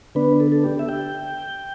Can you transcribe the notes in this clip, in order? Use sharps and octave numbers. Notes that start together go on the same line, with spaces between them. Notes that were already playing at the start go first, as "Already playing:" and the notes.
D3 B3 D4 B4
A4
A4
G4
E5
G5